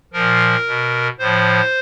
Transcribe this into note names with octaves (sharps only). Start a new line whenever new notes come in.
A#2 F3 A#4
B2
A2 F3 C5